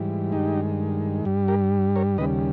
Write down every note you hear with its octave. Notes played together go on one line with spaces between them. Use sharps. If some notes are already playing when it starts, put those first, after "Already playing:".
Already playing: G#2 E3 G3
G2 D#3 G#3 D#4 G4
G2 G3
G4 A#4
A#4 C#5
D#2 C#3 G3 B4 D#5